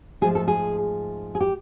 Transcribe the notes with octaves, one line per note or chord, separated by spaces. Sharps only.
G#2 F3 A3 G#4
A4
G#4
G#4
G4